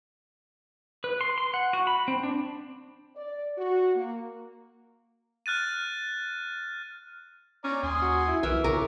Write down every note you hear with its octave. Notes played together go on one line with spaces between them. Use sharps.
B4
C6
C6
F#5
F#4
B5
C4
D4
D5
F#4
A#3
F6 F#6 A6 D#7
C#4 D5 A#5
D#2 G#5 C6 D#6
F#4
E4
B1 E3 A#4 E5
C#3 A#4 C#5 D6